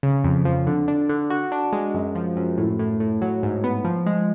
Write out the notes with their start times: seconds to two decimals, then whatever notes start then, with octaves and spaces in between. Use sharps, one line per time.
0.03 C#3
0.24 F2
0.45 F3
0.67 D3
0.88 D4
1.09 D3
1.30 F#4
1.52 D4
1.73 G#3
1.94 F#2
2.15 F3
2.36 F#2
2.58 A2
2.79 A2
3.00 A2
3.22 F#3
3.43 G#2
3.64 B3
3.85 F3
4.06 G#3